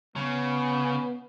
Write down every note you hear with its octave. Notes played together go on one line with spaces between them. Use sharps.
C#3 B3